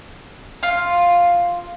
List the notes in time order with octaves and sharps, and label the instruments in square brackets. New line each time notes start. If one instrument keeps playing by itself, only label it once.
[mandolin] F4